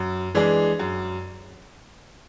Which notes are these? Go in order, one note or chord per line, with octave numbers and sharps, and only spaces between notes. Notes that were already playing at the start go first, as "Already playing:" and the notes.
Already playing: F#2
E3 G#3 D4 G#4
F#2